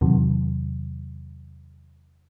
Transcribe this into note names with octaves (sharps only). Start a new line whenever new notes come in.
E2 C3 D#3 F#3